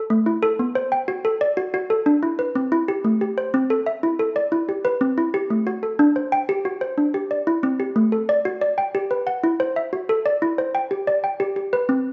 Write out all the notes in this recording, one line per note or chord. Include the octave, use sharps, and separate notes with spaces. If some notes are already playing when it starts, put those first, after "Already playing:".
Already playing: A4
A3
E4
A4
B3
C5
G5
F#4
A4
D5
F#4
F#4
A4
D4
E4
B4
C4
E4
G4
A3
G4
C5
C4
A4
E5
E4
A4
D5
E4
G4
B4
C4
E4
G4
A3
F#4
A4
D4
C5
G5
G4
F#4
C5
D4
G4
D5
E4
C4
G4
A3
A4
D5
F#4
D5
G5
G4
B4
F#5
E4
C5
E5
F#4
A4
D5
E4
C5
G5
G4
D5
G5
G4
G4
B4
C4